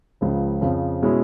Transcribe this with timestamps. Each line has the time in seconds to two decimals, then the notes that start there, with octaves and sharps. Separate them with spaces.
0.21 C#2 C#3 F3
0.61 F2 C#3 F3
1.03 B2 G#3 C#4 E4